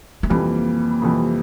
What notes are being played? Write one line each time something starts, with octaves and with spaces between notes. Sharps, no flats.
A3
F2 C3 E3 G3 A#3
F2 C3 E3 G3